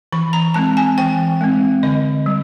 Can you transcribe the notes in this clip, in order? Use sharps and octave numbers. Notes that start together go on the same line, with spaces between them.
E3 B5
A#5
G#3 C4 A5
G#5
E3 G5
G#3 C4
D3 D#5
G3